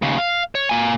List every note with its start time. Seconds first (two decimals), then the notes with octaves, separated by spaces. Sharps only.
0.02 D#2 C#3
0.18 F5
0.55 C#5
0.69 A#3 G#5